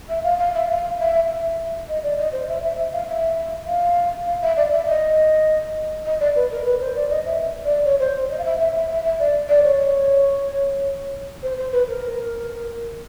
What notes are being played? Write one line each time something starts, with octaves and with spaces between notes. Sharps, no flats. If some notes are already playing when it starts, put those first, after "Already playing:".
E5
F5
F5
E5
F5
E5
E5
D#5
D5
D#5
C5
E5
E5
E5
F5
E5
F5
F5
E5
D5
E5
D#5
D#5
D5
B4
A#4
B4
C5
D5
D#5
E5
D5
C#5
C5
D#5
F5
E5
E5
E5
E5
E5
D5
D5
C#5
C5
C5
B4
A#4